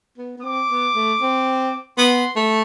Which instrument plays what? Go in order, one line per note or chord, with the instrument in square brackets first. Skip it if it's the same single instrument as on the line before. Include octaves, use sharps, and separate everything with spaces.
[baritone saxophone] B3
B3
[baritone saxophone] C4 [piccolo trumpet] D6
[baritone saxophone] B3
A3
C4
[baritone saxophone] B3 [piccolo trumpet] C6
[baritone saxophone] A3